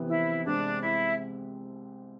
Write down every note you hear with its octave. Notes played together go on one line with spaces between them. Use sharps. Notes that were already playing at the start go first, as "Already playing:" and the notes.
Already playing: F2 C3 E3 B3
E4
C2 C3 G#3 C4 D4
E4